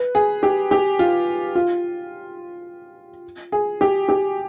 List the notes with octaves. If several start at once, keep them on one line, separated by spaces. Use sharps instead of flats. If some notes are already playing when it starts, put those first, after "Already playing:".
Already playing: B4
G#4
G4
G4
F4
F4
G#4
G4
G4